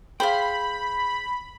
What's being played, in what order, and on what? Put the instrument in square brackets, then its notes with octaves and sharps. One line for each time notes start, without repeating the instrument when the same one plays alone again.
[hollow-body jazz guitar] G#4 G5 [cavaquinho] C5 F5 [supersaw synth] B5